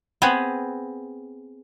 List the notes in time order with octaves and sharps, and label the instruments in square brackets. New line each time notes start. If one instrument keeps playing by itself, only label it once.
[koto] B3 C4 G#4 B4